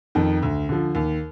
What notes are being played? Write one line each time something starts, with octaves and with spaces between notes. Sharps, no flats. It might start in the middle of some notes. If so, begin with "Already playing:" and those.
F2 D#3
D2
D3 F3
D#2